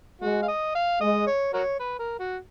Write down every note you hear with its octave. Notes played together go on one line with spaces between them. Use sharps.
G#3 F#4
F5
D#5
F5
G#3 D#5
C#5
F#4 A#4 C#5
B4
A#4
F#4